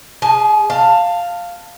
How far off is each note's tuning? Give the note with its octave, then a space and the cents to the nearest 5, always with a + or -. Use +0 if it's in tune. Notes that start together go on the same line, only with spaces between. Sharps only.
G#4 -10 G#5 +45
F5 +0 A5 +20